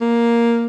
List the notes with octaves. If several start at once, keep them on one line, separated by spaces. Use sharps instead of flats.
A#3